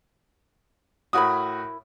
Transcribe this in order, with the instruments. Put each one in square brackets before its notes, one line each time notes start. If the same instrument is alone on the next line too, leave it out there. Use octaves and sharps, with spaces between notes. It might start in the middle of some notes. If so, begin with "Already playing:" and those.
[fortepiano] A2 F#4 D#6 [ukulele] E4 A#4 B5